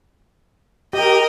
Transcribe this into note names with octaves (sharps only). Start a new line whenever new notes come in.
G4 A#4 D#5